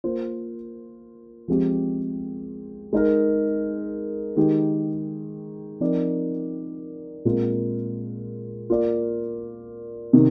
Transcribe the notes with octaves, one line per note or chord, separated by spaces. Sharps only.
A#3 F4 C5
F3 G#3 C4 G4
G#3 D#4 A#4
D#3 G#3 D#4 G4
F3 C4 D#4 A#4 D5
A#2 G#3 C4 F4 A#4
A#3 F4 A#4 D5
C3 D#3